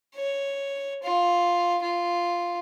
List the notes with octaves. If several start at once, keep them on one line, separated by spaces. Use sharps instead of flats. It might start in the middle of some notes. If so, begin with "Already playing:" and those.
C#5
F4
F4